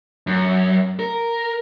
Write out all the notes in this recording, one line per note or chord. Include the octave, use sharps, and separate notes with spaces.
F#2
A#4